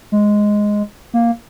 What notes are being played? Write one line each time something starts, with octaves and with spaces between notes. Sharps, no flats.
G#3
A#3